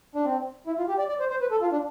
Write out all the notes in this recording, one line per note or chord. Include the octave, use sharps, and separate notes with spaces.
D4
C4
E4
F4
G4
D5
D5
C5
C5
B4
A4
F4
D4